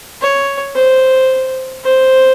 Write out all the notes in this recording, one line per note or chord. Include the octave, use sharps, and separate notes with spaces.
C#5
C5
C5